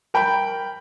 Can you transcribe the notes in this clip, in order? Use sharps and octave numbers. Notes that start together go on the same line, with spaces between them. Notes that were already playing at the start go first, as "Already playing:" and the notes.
A#4 G5 B5